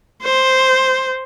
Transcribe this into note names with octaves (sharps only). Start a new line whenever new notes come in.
C5